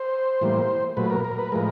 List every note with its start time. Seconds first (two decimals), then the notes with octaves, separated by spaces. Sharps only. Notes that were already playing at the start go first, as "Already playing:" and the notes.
Already playing: C5
0.41 A2 E3 G3 A#3
0.97 A#2 F#3 A3 B4
1.10 A#4
1.24 A#4
1.38 B4
1.52 A2 F3 G#3 A#4